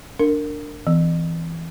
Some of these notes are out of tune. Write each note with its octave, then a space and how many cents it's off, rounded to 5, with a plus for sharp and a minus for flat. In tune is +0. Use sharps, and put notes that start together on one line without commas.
D4 +0 A#4 -20
E3 +0 C4 -45